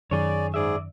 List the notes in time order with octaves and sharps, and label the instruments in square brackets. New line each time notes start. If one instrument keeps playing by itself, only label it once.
[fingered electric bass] F#2 D#3 [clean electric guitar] G#4 C#5 [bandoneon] D5
[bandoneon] G#2 G#4 [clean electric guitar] D5 E5